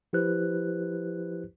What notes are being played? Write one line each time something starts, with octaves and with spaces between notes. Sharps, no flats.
F3 E4 G4 B4 C5 F#6